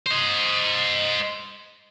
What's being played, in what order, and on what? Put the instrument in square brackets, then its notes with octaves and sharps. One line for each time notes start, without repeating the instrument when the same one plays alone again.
[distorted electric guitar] C5 D#5